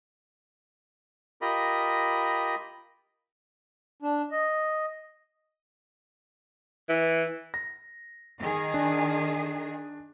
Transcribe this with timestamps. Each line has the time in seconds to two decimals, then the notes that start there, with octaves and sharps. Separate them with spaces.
1.42 F4 G4 A#4 D#5 B5
4.02 D4
4.32 D#5
6.89 E3
7.54 A#6
8.40 D#3 G#4
8.74 D4